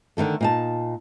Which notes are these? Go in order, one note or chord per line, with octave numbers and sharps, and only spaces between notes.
D3 D#3 F#3 A3
A#2 D#4 A5